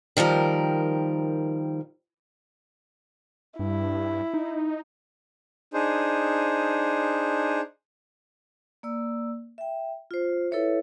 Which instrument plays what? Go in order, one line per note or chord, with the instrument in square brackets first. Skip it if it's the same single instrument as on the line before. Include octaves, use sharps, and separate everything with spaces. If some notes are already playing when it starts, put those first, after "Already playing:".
[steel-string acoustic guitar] D#3 F3 G3 A#4
[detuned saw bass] G2 [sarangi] E4
[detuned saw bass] D#4
[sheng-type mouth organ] D4 D#4 G#4 C5
[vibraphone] A#3 D5 E6
E5 G5
F4 C5
E4 A4 B4 C#5 E5